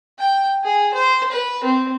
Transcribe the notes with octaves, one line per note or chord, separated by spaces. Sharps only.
G5
G#4
C5
B4
C4